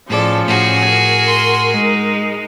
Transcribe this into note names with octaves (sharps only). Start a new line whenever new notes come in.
A2 F3 C#4 G#4 A4 D5
A2 F#4 G#4
A#4
C6
G#3 D#4